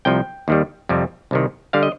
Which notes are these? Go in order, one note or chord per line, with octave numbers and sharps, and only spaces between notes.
C2 C3 F3 G5
D#2 D#3 G3
F2 C3 G3
C2 C3 D#3
D3 G3 F5
D#5